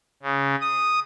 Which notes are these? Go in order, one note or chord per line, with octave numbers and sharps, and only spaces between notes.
C#3
D#6